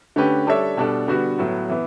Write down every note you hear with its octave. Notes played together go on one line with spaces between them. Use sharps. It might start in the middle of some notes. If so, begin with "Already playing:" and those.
D3 A3 C#4 G4 B4
G3 D4 A4 C#5 E5
B2 G3 D4 A4 D5
D3 G3 B3 F#4
A2 F#3 B3
E3 B3